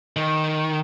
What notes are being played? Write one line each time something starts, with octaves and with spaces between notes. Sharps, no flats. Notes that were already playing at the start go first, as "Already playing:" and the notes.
D#3